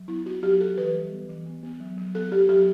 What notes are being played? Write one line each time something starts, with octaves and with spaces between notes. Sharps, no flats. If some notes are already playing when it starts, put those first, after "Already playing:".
Already playing: F#3
B3 E4
B3 F#4
F#3 G4
F#3 A4
E3 B4
G3
B3
E3
B3
B3
F#3
F#3
B3 A4
B3 G4
F#3 G4